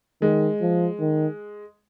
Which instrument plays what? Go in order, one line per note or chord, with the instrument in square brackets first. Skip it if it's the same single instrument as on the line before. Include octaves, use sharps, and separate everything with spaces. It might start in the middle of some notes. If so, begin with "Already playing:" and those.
[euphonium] D#3 [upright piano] G#3
[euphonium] F3
D#3